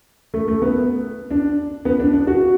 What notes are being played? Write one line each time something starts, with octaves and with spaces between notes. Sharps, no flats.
A3
A3
B3
D4
B3
D4
D4
F#4